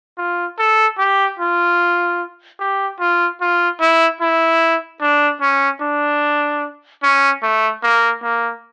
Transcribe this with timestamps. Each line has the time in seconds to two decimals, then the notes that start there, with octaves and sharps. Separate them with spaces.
0.18 F4
0.59 A4
0.98 G4
1.39 F4
2.60 G4
3.00 F4
3.41 F4
3.80 E4
4.21 E4
5.01 D4
5.41 C#4
5.81 D4
7.03 C#4
7.43 A3
7.83 A#3
8.23 A#3